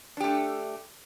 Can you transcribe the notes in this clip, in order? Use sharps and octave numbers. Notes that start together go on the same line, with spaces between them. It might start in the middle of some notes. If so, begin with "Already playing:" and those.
A3 D4 G4